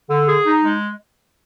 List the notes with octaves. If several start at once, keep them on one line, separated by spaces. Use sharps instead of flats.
D3
G#4
D#4
G#3